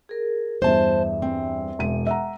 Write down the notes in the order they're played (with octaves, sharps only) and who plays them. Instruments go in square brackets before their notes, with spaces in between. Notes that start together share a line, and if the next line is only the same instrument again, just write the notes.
[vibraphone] G#4 A#4
[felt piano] E2 G2 [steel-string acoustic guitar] C5 A5 [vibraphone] E5
[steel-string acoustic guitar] C4
[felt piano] E1 D#7
E5 F#5 A#5